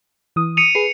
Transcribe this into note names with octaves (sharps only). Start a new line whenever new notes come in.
E3 D#6
C#7 D#7 F7
G#4 B4 C7